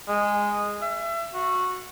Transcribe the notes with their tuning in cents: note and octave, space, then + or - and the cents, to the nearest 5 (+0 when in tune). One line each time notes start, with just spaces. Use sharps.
G#3 -10
E5 +30
F#4 -15